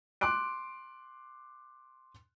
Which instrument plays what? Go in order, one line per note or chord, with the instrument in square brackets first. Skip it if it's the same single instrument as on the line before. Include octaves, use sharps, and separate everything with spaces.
[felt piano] C6 D6 F#6 D7